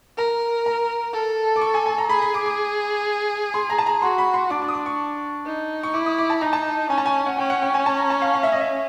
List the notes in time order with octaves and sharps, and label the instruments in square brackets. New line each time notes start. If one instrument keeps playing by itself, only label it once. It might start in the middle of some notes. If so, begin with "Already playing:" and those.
[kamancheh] A#4 [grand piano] A#5
[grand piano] A#5
[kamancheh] A4
[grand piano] D6
C#6
G#5
G#5
A#5
[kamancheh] G#4 [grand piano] B5
[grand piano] B5
D6
D6
C6
A#5
A5
A#5
[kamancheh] F#4 [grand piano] C6
[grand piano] B5
C6
[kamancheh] D4 [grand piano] D6
[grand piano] D6
D#6
D6
C#6
[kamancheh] D#4
[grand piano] C#6
[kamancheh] E4 [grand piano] D6
[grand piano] D#6
D6
A5
[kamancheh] D#4 [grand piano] A#5
[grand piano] A5
[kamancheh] C#4 [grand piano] G#5
[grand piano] A5
G#5
F#5
[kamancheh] C#4 [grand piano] G5
[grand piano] F#5
G5
G#5
A5
A#5
A5
F5
F5
E5
D#5
E5